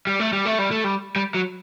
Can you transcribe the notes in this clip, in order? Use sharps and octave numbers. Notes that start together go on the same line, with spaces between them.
G3
A3
G3
A3
G3
A3
G3
G3
F#3